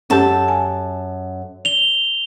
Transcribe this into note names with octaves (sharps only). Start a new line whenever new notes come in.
F#2 C#4 G4 A4 A5
G#5
F7 G7